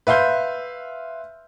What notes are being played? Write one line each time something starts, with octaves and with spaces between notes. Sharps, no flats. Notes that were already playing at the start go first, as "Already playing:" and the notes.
B4 E5 F5 C6 G6